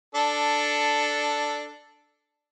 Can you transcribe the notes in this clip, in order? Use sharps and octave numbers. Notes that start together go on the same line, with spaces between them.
D4 A4